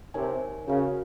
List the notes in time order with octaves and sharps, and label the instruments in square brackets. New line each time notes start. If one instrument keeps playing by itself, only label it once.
[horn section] C3 [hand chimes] D#4 A#4 C#5 G#5
[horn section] C#3 [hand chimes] F#4 A#4 F5